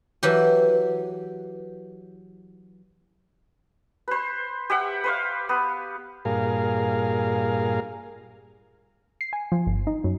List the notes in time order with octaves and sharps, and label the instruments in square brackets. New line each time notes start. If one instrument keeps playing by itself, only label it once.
[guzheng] E3 F#3 G4
[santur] B4 C5
G4 E5 F#5
B4 C5 F5
B3
[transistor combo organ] G2 A#2 G#4 A#4 F5
[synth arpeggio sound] C7
G#5
F3
G1
D#4
F#2